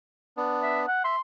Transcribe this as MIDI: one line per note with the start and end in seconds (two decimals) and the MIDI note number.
0.37 0.86 59
0.37 0.86 62
0.63 0.81 76
0.88 1.04 78
1.04 1.16 76
1.04 1.21 84